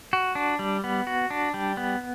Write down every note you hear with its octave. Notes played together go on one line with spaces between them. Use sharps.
F#4
D4
G3
B3
F#4
D4
G3
B3